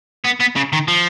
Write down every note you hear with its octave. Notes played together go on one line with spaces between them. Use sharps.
B3
B3
C#3
D#3
F3